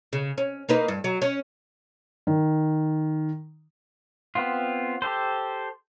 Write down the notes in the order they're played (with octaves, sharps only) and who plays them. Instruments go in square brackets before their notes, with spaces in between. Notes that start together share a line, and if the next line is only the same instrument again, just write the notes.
[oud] C#3
C#4
A#3 D#4 B4
G2
F#3
C#4
[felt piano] D#3
[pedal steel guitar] B3 C4 F4
G4 A4 C5